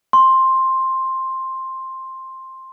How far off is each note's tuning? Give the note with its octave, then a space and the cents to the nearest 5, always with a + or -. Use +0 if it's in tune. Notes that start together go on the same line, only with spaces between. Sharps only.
C6 +10